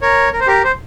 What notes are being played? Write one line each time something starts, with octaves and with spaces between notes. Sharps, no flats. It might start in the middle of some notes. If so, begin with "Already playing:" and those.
A#4 C#5
A#4
C5
G4 A#4
C5